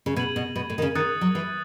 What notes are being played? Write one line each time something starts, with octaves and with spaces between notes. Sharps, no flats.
C#3
B2 G#6 D#7 F#7
B2
B2
A2
D#3
C#3
D#3 D#6 F#6 A6 C#7
F#3
E3